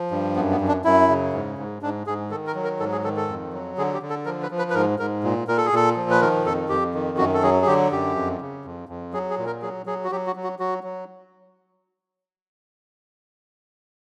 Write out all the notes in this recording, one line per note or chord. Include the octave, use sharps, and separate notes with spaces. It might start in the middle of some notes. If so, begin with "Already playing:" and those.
Already playing: F3
G2
F#2 B3
B3
F#2
D4
F#2 E4
C#3
G#2
G#2
G#2 D4
G#2 G#4
D#3 A4
A#4
F#3
A#4
G#2 A4
G#4
D#3 A4
A4
F2
F#3
D3 G#4
G4
D3
A4
F3 A#4
B4
F3
B4
B4
G#2 A#4
G#2 A#4
A#2
A#2 A#4
A4
G#4
A#2 A4
F3
B4
D#3 A#4
F2 A4
F2 G4
D#3
F#2 F#4
A4
F#3 G#4
G#4
D3 G4
F#2 G4
F2
C#3
F2
F2
F#3 G#4
G#4
A#2
A#4
F#3 G#4
F#3 G#4
F#4
F#3 G4
F#4
F#3
F#4
F#3 F#4
F#3